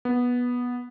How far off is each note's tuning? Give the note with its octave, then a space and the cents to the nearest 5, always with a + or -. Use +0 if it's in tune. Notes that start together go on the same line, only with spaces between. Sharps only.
B3 -10